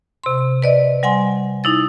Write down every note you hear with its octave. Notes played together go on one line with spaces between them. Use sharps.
C3 C6
B4 D5 D#5
G3 F#5 G#5 C6
D#4 E4 A6